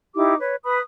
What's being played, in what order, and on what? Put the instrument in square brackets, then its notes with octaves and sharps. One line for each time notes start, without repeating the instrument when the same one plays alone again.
[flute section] D#4 E4 G4 D6
B4 C#5
B4 B5 D#6